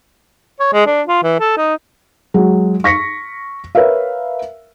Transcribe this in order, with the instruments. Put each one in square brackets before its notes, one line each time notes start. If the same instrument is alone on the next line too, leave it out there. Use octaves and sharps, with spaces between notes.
[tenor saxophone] C#5
G#3
D4
F4
E3
A4
D#4
[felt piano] F#3 G#3
C#6 A#6 B6 C#7
A#4 B4 C#5 E5 F5